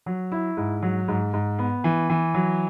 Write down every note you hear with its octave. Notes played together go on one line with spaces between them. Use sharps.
F#3
E4
G#2
F#3
G#2
G#2
B3
E3
E3
F#3